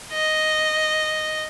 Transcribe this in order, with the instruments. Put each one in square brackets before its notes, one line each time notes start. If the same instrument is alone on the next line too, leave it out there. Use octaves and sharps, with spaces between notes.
[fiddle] D#5